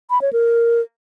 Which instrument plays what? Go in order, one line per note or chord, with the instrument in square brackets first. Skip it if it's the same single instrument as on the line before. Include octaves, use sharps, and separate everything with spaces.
[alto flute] B5
C#5
A#4